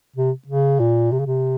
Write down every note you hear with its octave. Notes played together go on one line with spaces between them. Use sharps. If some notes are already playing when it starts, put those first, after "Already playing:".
C3
C#3
A#2
C3
C#3
C3